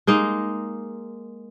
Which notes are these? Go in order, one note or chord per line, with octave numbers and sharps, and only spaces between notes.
G#3 A#3 D#4